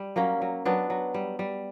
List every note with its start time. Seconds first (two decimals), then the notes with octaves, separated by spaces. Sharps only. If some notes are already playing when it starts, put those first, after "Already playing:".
Already playing: G3
0.16 F#3 A#3 C#4
0.42 F#3
0.65 F#3 B3 D4
0.90 F#3
1.14 G3
1.39 G3